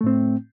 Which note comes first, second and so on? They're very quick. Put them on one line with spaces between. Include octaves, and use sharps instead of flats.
A3 A2 C4